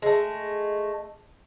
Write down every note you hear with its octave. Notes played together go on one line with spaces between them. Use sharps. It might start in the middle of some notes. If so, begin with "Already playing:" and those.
G#3 A3